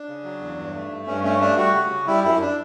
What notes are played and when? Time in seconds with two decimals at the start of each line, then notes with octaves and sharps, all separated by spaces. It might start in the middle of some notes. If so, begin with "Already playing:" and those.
Already playing: D4
0.09 C#3
0.24 F#3
0.41 E2
0.58 G2
0.74 A3
0.91 G2
1.07 G2 C#4
1.24 A3 C#4
1.41 A3 D4
1.57 G3 F#4
1.74 C#3
1.91 C#3
2.07 G3 E4
2.24 F#2 E4
2.41 D4